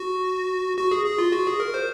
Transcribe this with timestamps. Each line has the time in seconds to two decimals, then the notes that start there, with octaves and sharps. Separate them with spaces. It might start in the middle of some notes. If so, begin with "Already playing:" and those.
Already playing: F#4
0.78 F#4
0.91 G#4
1.06 G#4
1.18 F4
1.32 F#4
1.47 G#4
1.60 A#4
1.74 C5